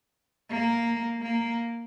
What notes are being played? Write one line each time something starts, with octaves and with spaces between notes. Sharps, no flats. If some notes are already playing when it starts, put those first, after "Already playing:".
A#3
A#3